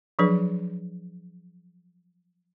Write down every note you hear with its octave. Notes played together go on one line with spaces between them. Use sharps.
F3 F#3 D4 G#4 B4